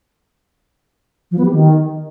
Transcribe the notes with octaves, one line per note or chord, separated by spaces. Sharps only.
F3
B3
G4
D#3